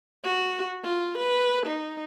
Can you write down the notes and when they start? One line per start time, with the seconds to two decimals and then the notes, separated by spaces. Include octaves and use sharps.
0.24 F#4
0.83 F4
1.18 B4
1.67 D#4